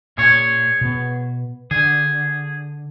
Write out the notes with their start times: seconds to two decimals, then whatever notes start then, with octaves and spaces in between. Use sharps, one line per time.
0.18 A#2 G#4 C#5
0.81 B2 B3
1.71 D3 G#4